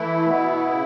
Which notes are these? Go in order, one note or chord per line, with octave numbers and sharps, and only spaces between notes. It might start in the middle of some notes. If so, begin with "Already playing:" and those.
Already playing: E3 A3 E4
B2 B3
C#3